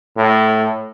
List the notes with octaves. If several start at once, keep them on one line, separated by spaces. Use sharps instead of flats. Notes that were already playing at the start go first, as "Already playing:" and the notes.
A2